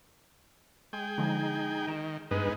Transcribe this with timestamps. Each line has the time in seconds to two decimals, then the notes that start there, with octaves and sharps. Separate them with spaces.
0.93 G#3 G#4 G5
1.18 D3 F3 G#3 D#4
1.87 D#3 D7 E7
2.31 G2 G#3 B3 D#4 B4